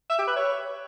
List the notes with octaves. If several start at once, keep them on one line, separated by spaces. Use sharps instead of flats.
E5
G4
B4
C#5